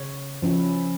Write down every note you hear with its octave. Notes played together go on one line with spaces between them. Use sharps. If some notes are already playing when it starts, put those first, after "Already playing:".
Already playing: C#3 C#5
F3 C#4 E4